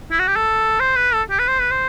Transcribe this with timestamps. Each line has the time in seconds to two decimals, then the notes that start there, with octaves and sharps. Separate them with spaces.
0.11 E4
0.19 F#4
0.27 G4
0.36 A4
0.80 C5
0.96 B4
1.13 A4
1.30 G4
1.39 B4
1.48 C5
1.60 B4
1.71 C5